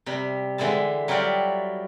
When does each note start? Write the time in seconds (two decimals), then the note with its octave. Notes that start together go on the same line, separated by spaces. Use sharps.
0.06 C3 G3 B5
0.58 D3 E3 G#3 E4 A5
1.08 F#3 G3 E4 F4 G4 D5